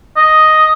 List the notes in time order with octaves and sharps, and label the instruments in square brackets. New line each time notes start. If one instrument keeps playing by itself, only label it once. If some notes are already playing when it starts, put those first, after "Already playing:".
[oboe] D#5